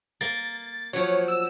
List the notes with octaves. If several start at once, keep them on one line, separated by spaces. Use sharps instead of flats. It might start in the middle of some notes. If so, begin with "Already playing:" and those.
A#3 A6
F3 F#3 C#5
E6